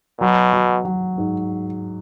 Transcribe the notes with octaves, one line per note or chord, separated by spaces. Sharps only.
B2 F#3
F#3
F#3
G#2